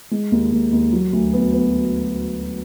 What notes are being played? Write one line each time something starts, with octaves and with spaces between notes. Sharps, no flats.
G#3
D#2
D#2
D#2
F#3
D2
B3
B3